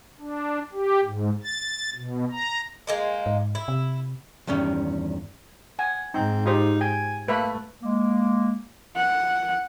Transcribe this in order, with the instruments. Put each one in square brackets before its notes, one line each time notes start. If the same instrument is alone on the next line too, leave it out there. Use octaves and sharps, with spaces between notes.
[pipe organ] D4
G4
G#2
A6
B2
A#5
[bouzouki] G#3 A#3 D#4
[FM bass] G#2
[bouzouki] E4
[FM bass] C3
[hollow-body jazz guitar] E2 G2 D#3 C#4
[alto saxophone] F#5 [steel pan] G#5
[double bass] G#2 [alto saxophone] C4 [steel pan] D#4
[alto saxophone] D#4 [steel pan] F4 G4 C5
[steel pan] G5 [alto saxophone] G#5
[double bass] A3 [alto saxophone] A#3 [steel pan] B4 E5 B5
[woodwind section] G#3 A#3
[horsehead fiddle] F#5